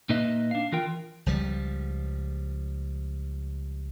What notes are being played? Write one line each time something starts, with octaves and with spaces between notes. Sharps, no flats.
A#2 A#3 D#4 B4 D#5 E5
D4 F5
E3 F4 A#4 G5
C#2 F3 G3